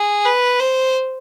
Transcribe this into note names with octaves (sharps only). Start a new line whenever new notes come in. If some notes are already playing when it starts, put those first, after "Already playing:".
Already playing: G#4
B4
C5